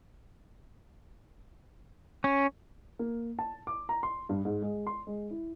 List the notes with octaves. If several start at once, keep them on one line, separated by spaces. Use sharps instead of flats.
C#4
A#3
A5
D6
A#5
C6
G2
G#2
G#3
C6
G#3
E4